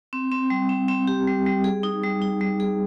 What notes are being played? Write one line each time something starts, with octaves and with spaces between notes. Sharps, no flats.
C4
C4
G3
C4
C4
G4
G3
G3
G#4
D#4
G3
D#4
G3
G#4